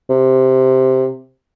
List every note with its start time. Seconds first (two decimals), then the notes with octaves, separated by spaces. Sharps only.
0.10 C3